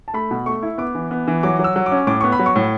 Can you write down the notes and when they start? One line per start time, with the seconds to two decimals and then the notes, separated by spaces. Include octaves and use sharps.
0.08 A5
0.14 A3 B5
0.31 B2
0.46 A3 C#6
0.63 E4
0.78 B3 D6
0.95 E3
1.11 B3
1.27 E3
1.43 F#3 D6
1.59 F#3
1.64 E6
1.76 F#3
1.86 D6
1.91 C#4
2.07 A2 D6
2.21 B3 C#6
2.32 B5
2.39 F#3
2.46 C#6
2.56 A2